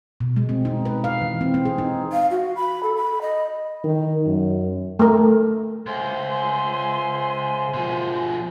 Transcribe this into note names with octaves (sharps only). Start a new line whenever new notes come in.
B2
G#3
C4
D#4
B4
F5
E3
C4
C4
G#4
D#4
F5
F#4
B5
A4
B5
D#5
D#3
F#2
A3 A#4
C#2 C5 E5 G#5 C6
B2 F3